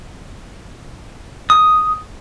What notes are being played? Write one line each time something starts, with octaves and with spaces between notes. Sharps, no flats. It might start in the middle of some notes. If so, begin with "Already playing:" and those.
D#6